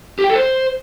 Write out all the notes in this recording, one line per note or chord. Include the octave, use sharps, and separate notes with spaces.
G4
G5
A4
C5